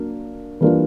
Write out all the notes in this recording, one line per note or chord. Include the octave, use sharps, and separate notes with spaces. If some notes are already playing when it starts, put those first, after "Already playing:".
Already playing: F#3 A#3 D4
E3 G3 A#3 D4 F4